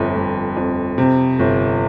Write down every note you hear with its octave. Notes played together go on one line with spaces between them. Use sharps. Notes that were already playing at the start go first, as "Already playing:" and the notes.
Already playing: G1 F2
G1
F2
C3
G1